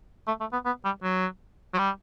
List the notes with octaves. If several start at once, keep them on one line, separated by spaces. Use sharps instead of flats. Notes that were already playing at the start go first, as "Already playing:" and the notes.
A3
A3
B3
B3
G3
F#3
F#3
G3